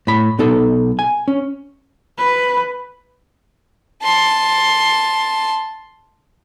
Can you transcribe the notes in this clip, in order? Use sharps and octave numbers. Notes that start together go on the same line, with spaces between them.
A2 B5
B1 B3 D#4 A4
G#5
C#4
B4
A5 C6